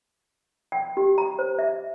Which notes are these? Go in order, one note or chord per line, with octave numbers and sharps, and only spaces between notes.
G5
G4
A#5
C5
E5